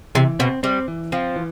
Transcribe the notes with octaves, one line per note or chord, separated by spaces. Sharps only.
C3 E3
B2 C4
G3 C4
E3
F3 C4
E3